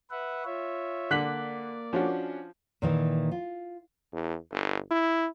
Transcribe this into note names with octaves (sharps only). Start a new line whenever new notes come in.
B4 E5 F#5
F4 C#5 E5
D3 A#3 D5 F#6 B6 F#7
F3 C#4 D4 F#4
A#2 D#3 E3
F4
E2
G1
E4